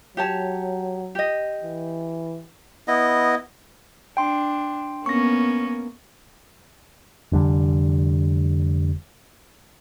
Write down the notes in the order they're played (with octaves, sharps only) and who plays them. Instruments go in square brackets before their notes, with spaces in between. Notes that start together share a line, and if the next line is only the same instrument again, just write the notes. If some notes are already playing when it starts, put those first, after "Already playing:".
[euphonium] F#3 [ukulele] G4 C#5 A5
[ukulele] G4 D#5
[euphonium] E3
[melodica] B3 E4 D#5
[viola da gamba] D4 [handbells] G5 C6
[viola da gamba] A#3 B3 C#4 [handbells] C#6 A#6
[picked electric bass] F1 D3 G3